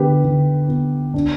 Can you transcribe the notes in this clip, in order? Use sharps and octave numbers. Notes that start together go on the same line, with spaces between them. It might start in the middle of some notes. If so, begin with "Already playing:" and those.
Already playing: D3 B3 G4 B4
D3
B3
D4